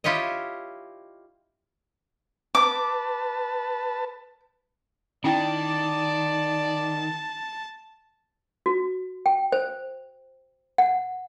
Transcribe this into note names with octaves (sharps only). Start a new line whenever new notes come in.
E4 F4 G4 C#5 D#5
B4 A5 D6
D#3 C#4 E4 D5 G5 A5
F#4
G5
C5
F#5